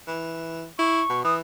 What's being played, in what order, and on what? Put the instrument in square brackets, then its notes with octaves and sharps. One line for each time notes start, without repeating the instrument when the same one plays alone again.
[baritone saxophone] E3
[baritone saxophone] E4 [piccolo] C#6
[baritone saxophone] B2
[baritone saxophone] E3 [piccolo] D#6